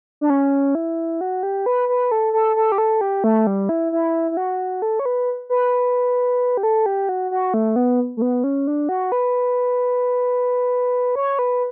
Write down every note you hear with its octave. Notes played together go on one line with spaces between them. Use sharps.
D4
C#4
E4
F#4
G4
B4
B4
A4
A4
A4
G4
A4
G4
A3
G3
E4
E4
E4
F#4
A4
C#5
B4
B4
G4
A4
G4
F#4
F#4
A3
B3
A3
B3
C#4
D4
F#4
B4
C#5
B4